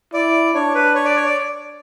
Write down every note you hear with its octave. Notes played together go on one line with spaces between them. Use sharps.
E4 D5
D4 C#5
B4
C#5
D5
C#5
D5